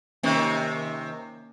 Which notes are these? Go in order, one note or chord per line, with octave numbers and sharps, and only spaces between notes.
C3 D#3 A#3 C#4 E5